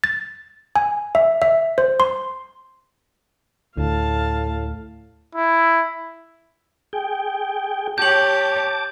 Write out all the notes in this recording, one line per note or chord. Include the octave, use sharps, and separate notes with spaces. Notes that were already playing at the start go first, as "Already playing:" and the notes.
A6
G#5
E5
E5
C5
C6
D2 A2 F5 A5
E4
G#4 G5
G4 C#5 A5 D6 G6 F#7